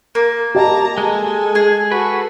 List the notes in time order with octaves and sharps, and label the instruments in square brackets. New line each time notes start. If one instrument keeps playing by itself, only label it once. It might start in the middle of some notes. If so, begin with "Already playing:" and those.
[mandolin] A#3
[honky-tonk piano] G4 D#5 [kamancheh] A5 A#5
[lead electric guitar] G#3 [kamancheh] A4 G#5
[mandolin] G#4
[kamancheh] F#4 A4 [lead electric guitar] B4